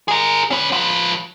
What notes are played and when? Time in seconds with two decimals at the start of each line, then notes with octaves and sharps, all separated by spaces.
0.08 G#4 A#4
0.51 C#4 B4
0.73 F3 B4